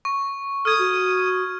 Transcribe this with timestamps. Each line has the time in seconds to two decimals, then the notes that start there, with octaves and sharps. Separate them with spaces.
0.05 C#6
0.65 A4 D#6 F6 G#6
0.79 F#4